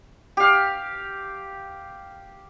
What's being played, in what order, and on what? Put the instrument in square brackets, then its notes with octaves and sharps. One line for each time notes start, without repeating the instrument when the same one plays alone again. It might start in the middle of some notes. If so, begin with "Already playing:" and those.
[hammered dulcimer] G4 F5